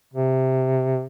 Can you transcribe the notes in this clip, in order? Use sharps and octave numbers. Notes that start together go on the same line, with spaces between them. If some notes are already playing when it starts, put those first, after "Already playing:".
C3